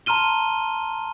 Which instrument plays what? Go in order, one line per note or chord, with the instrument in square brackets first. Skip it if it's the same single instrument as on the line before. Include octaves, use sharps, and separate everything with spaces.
[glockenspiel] A5 A#5 C6 F6 D#7 G7